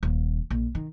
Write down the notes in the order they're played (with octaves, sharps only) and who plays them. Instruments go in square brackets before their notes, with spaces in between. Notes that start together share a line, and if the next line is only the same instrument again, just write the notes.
[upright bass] D#1
A#1
D#3